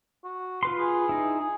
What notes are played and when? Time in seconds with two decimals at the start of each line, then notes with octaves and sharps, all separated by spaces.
0.24 F#4
0.63 F4 B4 C6
0.79 G#4
1.09 D#4 E4
1.39 G#4